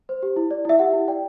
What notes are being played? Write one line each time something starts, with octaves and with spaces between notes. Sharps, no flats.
C5
G4
E4
D5
E4 E5
G4 F#5
E4
D5 G5